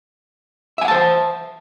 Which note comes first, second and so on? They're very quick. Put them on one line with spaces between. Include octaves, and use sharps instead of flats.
E5 G#5 F#5 A5 C5